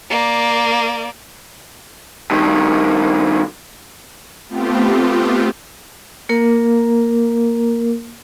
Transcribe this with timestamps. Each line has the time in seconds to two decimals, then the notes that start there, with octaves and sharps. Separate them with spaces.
0.10 A#3 D5
2.31 G2 D#3
4.49 A3 B3 C4 F4 G4
6.29 A#3 A#4